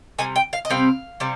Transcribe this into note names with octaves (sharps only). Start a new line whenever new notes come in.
C3 G3 G#5
G5
F5
D#5
C3 G3 C4 F5
C3 G3